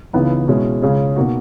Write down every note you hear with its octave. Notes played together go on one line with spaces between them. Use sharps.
C#2 C#3 E3 B3 D#4
B2 G#3 C#4 E4
C#2 C#3 G#3 C#4 G#4
B2 A#3 D#4 F#4